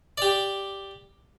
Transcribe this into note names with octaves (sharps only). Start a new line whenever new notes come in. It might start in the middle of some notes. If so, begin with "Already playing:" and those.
G4 D5